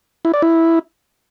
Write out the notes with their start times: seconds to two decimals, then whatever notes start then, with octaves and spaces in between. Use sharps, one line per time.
0.25 E4
0.34 D5
0.42 E4